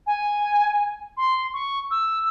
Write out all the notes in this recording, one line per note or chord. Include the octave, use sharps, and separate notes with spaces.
G#5
C6
C#6
E6